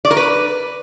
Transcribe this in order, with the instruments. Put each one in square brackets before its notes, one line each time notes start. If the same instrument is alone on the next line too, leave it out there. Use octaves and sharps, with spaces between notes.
[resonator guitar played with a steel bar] D5
A#4
B4